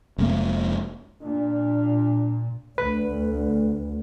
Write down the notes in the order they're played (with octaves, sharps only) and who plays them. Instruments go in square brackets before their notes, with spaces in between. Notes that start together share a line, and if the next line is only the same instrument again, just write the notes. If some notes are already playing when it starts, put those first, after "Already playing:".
[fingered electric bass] F1 G#3 A#3
[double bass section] A#2 [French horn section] D4
[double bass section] D2 [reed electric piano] B4